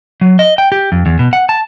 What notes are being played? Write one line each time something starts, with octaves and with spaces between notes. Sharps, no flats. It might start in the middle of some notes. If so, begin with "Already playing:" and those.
F#3
D#5
G5
G4
F2
E2
B2
F#5
A5